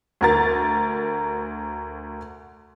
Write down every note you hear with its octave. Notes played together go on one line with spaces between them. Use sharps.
D2 A#4 A6